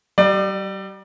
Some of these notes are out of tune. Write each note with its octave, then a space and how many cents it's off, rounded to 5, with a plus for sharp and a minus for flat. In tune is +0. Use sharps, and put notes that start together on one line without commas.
G3 -35 D5 +30